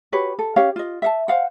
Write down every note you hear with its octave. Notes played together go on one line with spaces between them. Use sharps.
F#4 G4 B4 C#5
A4
C#4 G4 C#5 F5
F4 D#5
E5 F5 A5
C5 F5 F#5